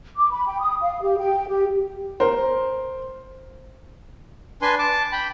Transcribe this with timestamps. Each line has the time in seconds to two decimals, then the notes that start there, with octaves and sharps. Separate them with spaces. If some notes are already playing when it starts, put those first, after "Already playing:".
0.16 D6
0.31 B5
0.47 G5
0.60 D#6
0.81 F5
1.02 G4
1.18 G5
1.49 G4
2.20 A#4 C5
4.62 D4 B4 G#5 C6
4.79 A5 D6
5.12 G5 B5